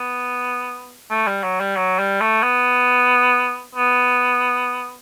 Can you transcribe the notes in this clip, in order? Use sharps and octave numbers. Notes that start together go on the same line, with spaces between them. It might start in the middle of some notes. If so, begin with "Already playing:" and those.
Already playing: B3
A3
G3
F#3
G3
F#3
G3
A3
B3
B3